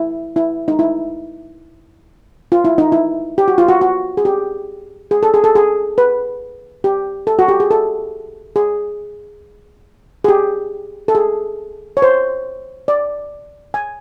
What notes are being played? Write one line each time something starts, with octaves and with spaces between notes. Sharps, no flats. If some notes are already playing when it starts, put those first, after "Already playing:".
Already playing: E4
E4
D#4
E4
F4
E4
D#4
E4
G4
F#4
F4
F#4
F#4
G#4
G4
G#4
A4
G#4
A4
G#4
B4
G4
A4
F#4
G4
G#4
A4
G#4
G#4
G4
A4
G#4
C#5
C5
D5
G#5